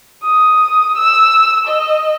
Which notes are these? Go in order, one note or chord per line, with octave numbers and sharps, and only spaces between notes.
D#6
E6
D#5